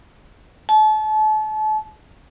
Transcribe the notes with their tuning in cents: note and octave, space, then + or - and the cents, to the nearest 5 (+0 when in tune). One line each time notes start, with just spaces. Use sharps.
A5 -35